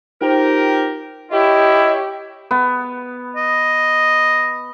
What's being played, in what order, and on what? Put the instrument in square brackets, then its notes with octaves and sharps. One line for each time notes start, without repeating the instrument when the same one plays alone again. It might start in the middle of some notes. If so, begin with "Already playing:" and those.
[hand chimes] D#4 F4 C5 [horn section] G4 A#4
[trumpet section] E4 C#5 [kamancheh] G4 [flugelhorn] D#5
[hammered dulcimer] B3
[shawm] D#5